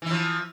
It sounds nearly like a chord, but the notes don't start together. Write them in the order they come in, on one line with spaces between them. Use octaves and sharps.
E3 E4 F3